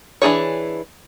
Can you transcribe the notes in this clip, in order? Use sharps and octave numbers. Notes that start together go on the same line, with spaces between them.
E3 D4 G#4 C#5